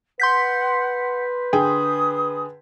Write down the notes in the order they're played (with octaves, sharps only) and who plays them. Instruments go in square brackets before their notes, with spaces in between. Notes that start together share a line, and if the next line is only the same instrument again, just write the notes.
[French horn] B4 [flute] F#5 [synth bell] C6 G6 B6
[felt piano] D3 G#4 G5 [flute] D#6